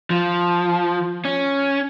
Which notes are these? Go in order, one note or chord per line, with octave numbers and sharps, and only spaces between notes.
F3
C#4